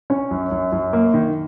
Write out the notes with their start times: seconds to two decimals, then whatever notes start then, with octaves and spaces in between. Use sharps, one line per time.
0.10 C#4
0.31 F#2
0.51 F#2
0.72 F#2
0.93 A#3
1.14 D#3